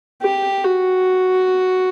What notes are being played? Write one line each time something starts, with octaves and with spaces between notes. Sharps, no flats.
G4
F#4